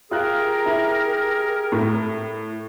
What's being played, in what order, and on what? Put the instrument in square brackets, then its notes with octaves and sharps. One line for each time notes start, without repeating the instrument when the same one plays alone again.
[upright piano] F4 F#6 [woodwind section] G4 G#4 A#4
[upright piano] E4
A2